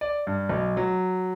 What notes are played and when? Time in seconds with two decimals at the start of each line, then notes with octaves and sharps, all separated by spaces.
0.01 D5
0.27 G2
0.49 B1
0.77 F#3